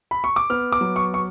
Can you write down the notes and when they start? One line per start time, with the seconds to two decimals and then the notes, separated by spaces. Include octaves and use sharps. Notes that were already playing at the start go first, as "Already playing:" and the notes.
0.11 B5
0.24 C#6
0.36 D6
0.50 B3 F6
0.72 D6
0.81 F#3
0.96 C#6
1.14 C#6